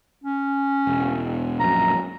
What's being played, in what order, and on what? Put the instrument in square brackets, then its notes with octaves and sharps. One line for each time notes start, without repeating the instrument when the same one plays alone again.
[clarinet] C#4
[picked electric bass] E1
[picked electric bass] A#1 F#2 [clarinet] A#5